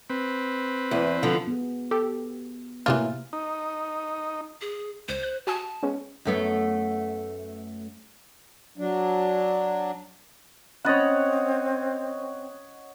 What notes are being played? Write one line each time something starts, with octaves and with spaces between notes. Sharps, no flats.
C4 B4
E2
D3 F3
B3 G#4
G4 A4
A2 C3 E3 F#3 A#3 F4
D#4
G#4
C#2 C5
F#6
F#4 G#5 A5 D#6
G#3 B3 C#4
F#2 A3 B3
F#3 D4
C4 C#4 C#5 D#5 F#5 B5 A6